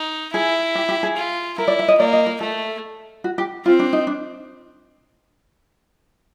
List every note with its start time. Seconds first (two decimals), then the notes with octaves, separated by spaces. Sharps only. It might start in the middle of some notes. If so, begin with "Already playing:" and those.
Already playing: D#4
0.33 E4 G#4
0.75 G4
0.89 G4
1.03 G#4
1.16 F4
1.58 E4 A#4
1.68 D5
1.79 E5
1.88 D#5
1.99 A#3 D5
2.13 D#5
2.26 A#4
2.41 A3 A4
3.24 F#4
3.38 G4
3.65 C4 F4
3.79 D4
3.93 D#4
4.07 D4